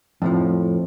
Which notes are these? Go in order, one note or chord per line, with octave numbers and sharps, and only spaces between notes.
F2 A2 F3